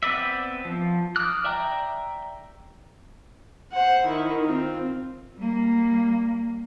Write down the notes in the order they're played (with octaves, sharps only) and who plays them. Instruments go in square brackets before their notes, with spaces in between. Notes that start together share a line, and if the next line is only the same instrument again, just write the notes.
[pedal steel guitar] B3 C4 B4 D5 E5
F3
D6 D#6 F6 F#6
D5 E5 G5 A#5
[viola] C5 F#5
D#3 E4
C4 F4
[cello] G3 A#3